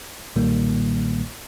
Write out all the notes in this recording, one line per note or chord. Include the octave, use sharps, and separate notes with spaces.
B1 A#2 D#3 G3 A#3